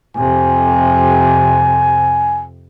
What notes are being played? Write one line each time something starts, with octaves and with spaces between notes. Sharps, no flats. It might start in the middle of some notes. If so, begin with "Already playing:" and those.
F2 C3 G#5